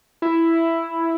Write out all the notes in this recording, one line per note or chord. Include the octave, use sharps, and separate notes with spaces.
E4